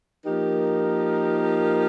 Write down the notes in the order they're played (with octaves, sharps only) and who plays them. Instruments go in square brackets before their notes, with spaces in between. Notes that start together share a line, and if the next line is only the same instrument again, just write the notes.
[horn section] F3 A#3 D#4 G4 A#4